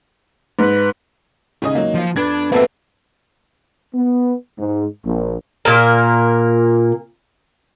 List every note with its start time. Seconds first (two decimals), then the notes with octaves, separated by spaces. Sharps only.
0.59 G#2 B4
1.62 D#2 C#3 G#4 D#5 G#5 D#6
1.75 F#3 A#3
1.95 F3 C5
2.16 F2 B3 D4 G#6
2.52 A#3 C4 F#4 A4 B4 E5
3.95 B3
4.59 G#2
5.05 A#1
5.65 A#2 A#3 A#4